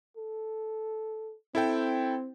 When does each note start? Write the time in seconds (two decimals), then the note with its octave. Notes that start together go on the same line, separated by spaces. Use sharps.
0.17 A4
1.55 C4 E4 A4 G5